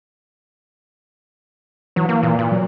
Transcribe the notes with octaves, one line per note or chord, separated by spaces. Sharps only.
E3 F#3
A#3
A#2
A#2
F#3